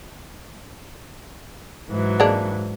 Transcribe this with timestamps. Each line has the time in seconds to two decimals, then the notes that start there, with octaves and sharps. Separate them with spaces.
1.89 G#2 E3 F#3
2.20 G#3 A#3 D4